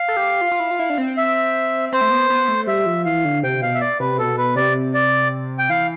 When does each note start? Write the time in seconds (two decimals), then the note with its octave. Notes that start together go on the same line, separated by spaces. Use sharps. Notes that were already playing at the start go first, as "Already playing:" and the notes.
Already playing: F5
0.08 A4
0.17 G4
0.41 F4
0.52 F4
0.60 E4
0.71 F4
0.79 E4
0.90 D4
0.98 C4
1.17 E5
1.92 C4 C5
2.01 A3
2.11 B3
2.30 B3
2.48 A3
2.67 G3 E5
2.86 F3
3.05 E3 F5
3.25 D3
3.43 C3 G5
3.62 B2 F5
3.74 E5
3.81 D5
4.00 C3 B4
4.19 B2 A4
4.38 B4
4.56 C3 D5
4.94 D5
5.59 G5
5.69 E3 F5